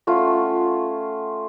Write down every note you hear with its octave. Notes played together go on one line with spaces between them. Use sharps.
A3 C#4 F4 F#5